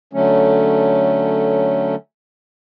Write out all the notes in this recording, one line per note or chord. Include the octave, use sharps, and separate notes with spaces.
D3 F#3 A3 C#4